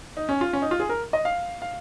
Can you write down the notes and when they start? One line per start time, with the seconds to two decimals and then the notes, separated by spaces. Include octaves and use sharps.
0.17 D#4
0.29 C#4
0.41 F4
0.53 C#4
0.62 D#4
0.71 F4
0.80 G#4
0.89 A#4
1.13 D#5
1.25 F5
1.62 F5